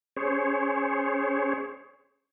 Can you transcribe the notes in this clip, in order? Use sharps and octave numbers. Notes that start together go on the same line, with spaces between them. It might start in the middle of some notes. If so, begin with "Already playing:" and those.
C#4 G#4 C5 C#5